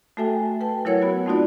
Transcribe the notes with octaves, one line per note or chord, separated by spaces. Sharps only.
A3 F#4 A4 E5 G5 G#5
B4 G5 A5
F#3 E4 A#4 C#5 F#5 G#6
B3 F#4
A3 C4 D#4 F4 F#4 D5